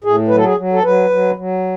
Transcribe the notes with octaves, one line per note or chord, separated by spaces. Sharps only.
A2 G#4
F#3 B4
A4
G#4
F#3
A4
F#3 B4
F#3
F#3